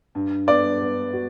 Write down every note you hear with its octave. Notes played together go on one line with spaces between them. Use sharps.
G2
B3 D5
B3
F#4